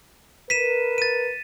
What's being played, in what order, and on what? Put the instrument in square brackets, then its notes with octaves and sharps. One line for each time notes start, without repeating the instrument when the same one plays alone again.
[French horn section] A#4 B4 [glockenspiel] B6 D#7 E7
[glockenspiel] A6 D#7